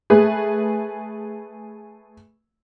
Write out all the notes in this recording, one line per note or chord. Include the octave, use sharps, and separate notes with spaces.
A3 G#4 B4